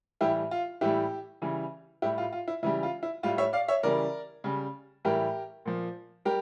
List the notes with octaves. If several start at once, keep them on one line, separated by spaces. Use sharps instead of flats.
A2 E3 G3 E4 G4
F4
A2 E3 G3 E4 G4
C#3 E3 G3
A2 G3 E4 G4
F4
F4
E4
C#3 E3 G3 E4
F4
E4
A2 G3 F4
C#5 E5
D5 F5
C#5 E5
C#3 E3 G3 A#4 D5
C#3 G3
A2 E3 G3 G4 A#4
A#2 F3
G3 G4 A#4